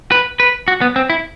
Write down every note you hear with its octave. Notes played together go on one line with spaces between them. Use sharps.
B4
B4
F#4
B3
C4
E4